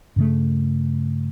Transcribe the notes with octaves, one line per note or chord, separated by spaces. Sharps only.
G2 C#3 A3